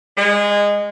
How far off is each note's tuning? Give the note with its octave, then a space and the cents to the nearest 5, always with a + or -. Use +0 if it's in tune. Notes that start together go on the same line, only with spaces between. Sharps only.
G#3 -20